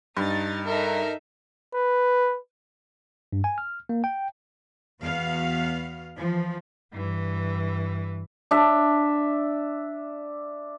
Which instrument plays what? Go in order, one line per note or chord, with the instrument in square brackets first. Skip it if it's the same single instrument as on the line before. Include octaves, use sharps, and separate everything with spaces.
[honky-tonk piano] G2 [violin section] D#4 A6
[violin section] D#4 A4 E5 [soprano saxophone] A#4
[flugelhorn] B4
[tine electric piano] G2
G#5
F6
A#3
G5
[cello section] E2 B3 F#4 F5
E3 F3
[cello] G2 E3
[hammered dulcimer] D4 E5